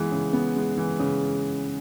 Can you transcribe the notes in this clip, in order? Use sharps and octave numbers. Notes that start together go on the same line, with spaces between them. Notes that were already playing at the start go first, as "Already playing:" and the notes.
Already playing: E3 G#3 B3
C#3
B3
G#3
E3
C#3